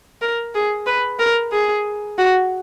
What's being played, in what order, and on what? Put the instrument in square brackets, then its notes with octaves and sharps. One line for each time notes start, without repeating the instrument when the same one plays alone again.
[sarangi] A#4
G#4
B4
A#4
G#4
F#4